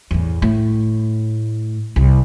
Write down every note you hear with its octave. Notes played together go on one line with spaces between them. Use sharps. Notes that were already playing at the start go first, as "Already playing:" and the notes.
E2 A2
A2
C2